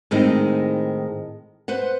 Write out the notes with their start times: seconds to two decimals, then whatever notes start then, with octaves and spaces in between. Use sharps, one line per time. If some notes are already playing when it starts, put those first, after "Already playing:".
0.11 A2 D#3 G#3 C4 D#4
1.68 B4 C5 F#5